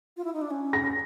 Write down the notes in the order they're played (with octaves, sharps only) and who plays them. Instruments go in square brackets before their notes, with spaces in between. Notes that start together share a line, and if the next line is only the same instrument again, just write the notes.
[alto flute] F4
E4
D#4
D4
C#4
[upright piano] A#6